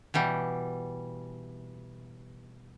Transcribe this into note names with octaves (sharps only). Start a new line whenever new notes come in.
B2 E3 G3